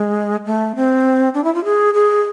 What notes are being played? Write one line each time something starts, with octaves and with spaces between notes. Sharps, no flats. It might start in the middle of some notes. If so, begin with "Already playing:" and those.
Already playing: G#3
A3
C4
D4
E4
F4
G#4
G#4